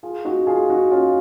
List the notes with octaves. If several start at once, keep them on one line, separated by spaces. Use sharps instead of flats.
F4 G#4
D#4 F#4
F4 G#4
D#4 F#4
C#4 F4